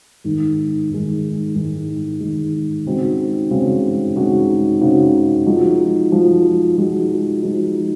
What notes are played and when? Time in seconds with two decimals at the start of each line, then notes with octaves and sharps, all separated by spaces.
0.24 G#2 D#3 G#3
0.90 G#2 D#3 G#3
1.55 G#2 D#3 G#3
2.20 G#2 D#3 G#3
2.86 C#3 G#3 C4 D#4 F#4
3.51 C#3 G#3 C4 D#4 F#4
4.16 C#3 G#3 C4 D#4 F#4
4.81 C#3 G#3 C4 D#4 F#4
5.46 F3 G#3 D#4 F#4
6.12 F3 G#3 D#4 F#4
6.77 F3 G#3 D#4 F#4
7.43 F3 G#3 D#4 F#4